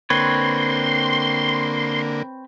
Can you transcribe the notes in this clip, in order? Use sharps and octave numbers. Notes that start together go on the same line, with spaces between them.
D3 A#3 C4 B4 C#5 C6